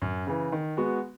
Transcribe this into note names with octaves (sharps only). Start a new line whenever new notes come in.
F#2
C#3 E3
D#3
G#3 B3 F#4